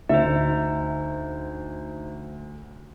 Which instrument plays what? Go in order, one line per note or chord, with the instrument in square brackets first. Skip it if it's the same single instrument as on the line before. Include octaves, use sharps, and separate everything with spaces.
[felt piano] D2 [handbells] D#4 C5 [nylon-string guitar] E5